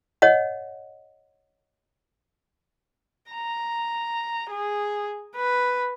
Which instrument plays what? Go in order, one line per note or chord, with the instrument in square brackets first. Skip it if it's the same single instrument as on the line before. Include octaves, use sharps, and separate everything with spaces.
[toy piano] C#5 D#5 F#5
[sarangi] A#5
G#4
B4